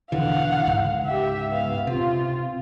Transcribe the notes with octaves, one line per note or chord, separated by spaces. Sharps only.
E1 D3 E3 F5 F#5
C#2 G#2
G4 E5
B3 F5
C3 F4